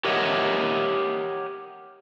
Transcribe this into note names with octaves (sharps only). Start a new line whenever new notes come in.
G4 A#4 C#5 D#5 E5 F#5